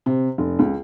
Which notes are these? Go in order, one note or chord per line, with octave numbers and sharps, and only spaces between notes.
C3
F1
C#2